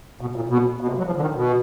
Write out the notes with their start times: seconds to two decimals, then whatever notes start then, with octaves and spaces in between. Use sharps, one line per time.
0.21 B2
0.36 A#2
0.49 B2
0.81 B2
0.88 C3
0.98 F#3
1.06 F3
1.16 D3
1.21 D#3
1.35 B2